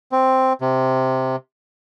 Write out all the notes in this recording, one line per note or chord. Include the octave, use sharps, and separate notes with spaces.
C4
C3